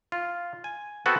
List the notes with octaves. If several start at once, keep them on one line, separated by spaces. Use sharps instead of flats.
F4
G#5
B3 C4 F#4 A4 B4